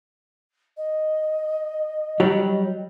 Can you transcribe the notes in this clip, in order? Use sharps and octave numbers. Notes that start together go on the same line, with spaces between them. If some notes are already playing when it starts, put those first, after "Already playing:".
D#5
F#3 G3